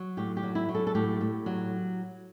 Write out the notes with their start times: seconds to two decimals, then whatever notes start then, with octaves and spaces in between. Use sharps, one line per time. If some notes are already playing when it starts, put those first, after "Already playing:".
Already playing: F#3
0.17 A2 G4
0.37 G4
0.43 F#3
0.55 E4
0.69 F#3
0.75 A4
0.87 A4
0.95 A2 G4
1.21 A2
1.46 F#3